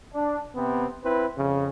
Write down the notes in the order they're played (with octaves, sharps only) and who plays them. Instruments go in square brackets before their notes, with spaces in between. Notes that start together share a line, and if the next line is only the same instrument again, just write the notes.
[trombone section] D4
C3 B3 C4
C4 E4 B4
F2 C#3